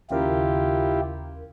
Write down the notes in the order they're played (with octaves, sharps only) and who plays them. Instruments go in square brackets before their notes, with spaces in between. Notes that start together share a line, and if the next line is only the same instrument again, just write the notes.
[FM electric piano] D#2 C#3 A#4 [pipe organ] E4 F4 G4